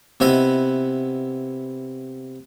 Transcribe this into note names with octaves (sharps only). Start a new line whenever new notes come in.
C3 B3 E4 B4 D#5